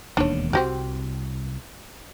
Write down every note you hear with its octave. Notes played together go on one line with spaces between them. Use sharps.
E1 D#2 D#3 D4 C#5
C2 C4 F#4 G4